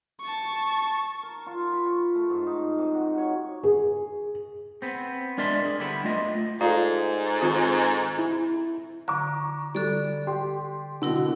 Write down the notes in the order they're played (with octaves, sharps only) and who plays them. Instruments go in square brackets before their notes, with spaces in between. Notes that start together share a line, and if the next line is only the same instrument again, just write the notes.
[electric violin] A5 C#6
[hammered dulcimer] A#4
F4
B5
C#6
A3
G#2
D#4
C3
F#4
C#5
[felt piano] G#4
[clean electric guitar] B3 C4
G#3 D4 A#4 D5 E5 C6
G#4
D3 G3 B3 E4
A3 F4 D#5
[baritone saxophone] G#2 [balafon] F4 D5 F5 [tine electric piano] A4 A#5
[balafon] D#3 C4 F4
[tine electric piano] E4
[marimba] D3 [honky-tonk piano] A#5 C#6 D6
[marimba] D3 A4 D5 [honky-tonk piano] G3
[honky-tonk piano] G4 C6
[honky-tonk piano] B2 D3 [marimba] B3 E4 A#4